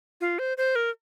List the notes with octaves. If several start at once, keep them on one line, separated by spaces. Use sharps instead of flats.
F4
C5
C5
A#4